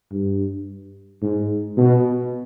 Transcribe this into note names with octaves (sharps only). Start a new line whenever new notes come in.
G2
G#2
B2